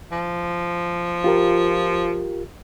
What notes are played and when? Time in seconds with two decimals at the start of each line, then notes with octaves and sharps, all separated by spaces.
0.12 F3
1.24 F4 G4 A#4